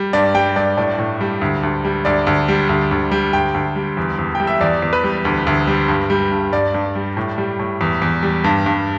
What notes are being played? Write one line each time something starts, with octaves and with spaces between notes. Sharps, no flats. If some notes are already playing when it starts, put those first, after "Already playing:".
Already playing: G3
G2 D5
G3 G5
G2 D5
A2 D5
A2
G3
D2
D2
G3
D2 D5
D2
G3
D2
D2
G3
D2 G5
D2
G3
E2
E2
G3 G5
E5
E2 D5
E2
B4
G3
D2
D2
G3
G2
G3
G2
G2 D5
G2
G3
A2
G3
A2
E2
E2
G3
G2
G2